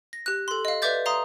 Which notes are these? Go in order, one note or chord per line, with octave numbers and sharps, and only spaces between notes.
A#6
G4 F#6
A4 C6
D#5 F5
B4 D5 E5 D6 G6 A6
F5 A#5 C6 D#6